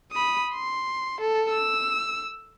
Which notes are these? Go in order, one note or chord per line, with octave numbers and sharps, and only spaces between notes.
B5 D#6
C6
A4
E6